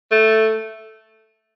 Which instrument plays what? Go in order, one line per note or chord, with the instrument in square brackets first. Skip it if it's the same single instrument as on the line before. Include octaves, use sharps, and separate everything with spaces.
[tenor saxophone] A3